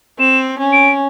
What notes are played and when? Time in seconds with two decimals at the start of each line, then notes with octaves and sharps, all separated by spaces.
0.19 C4 E7
0.59 C#4
0.73 D7